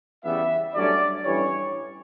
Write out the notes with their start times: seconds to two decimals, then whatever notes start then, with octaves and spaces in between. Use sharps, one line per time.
0.24 E2 C#3 E3 G3 B3 E5
0.74 G2 F#3 A3 C#4 D5
1.25 A1 G2 E3 G3 C#5